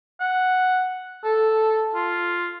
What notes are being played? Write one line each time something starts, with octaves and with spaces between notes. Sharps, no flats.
F#5
A4
F4